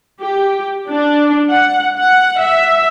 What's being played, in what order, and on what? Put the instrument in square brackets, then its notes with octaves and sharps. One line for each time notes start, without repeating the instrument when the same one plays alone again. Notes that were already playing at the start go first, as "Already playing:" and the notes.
[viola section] G4
D4
F#5
F#5
E5